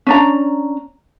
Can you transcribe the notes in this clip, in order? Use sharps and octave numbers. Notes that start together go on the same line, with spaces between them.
C#4 D4 A#5